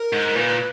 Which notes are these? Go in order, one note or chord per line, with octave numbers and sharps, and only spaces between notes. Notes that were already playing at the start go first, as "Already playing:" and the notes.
Already playing: A#4
G#2
A#2 B4